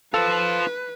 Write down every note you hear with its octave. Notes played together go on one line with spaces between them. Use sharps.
F4 A4 B4 C5